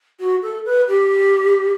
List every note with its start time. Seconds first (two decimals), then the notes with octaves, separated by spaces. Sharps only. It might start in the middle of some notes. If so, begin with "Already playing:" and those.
0.20 F#4
0.43 A4
0.66 B4
0.88 G4